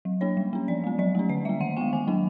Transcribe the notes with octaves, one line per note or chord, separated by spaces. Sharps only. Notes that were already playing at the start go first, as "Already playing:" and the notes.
F#3
A#3 D4 C#5
G3
A#3 C#4
F3 D5
G#3 B3
F#3 D5
A3 C#4
D3 D#5
G3 A#3 E5
D#3 F#5
G#3 B3 G5
D#3 G#5
F#3 A#3 D4